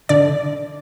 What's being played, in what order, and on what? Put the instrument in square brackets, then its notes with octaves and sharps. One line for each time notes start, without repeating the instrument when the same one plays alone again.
[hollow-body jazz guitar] D3 [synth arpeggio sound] D5